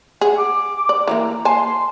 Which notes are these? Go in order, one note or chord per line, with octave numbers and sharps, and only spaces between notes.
G#4 F#5
D6
D5
E3 G3 A#3 A#5
A#3 G#5 A5 C6